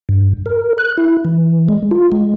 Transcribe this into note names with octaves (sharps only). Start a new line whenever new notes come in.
G2
A#4
F#6
E4
E3
G#3
F4
G#3